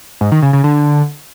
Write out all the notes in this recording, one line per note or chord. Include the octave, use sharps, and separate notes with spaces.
G#2
D#3
C#3
C#3
D3